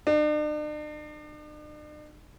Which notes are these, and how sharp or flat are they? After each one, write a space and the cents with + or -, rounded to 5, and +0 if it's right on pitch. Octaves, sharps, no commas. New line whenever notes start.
D4 +45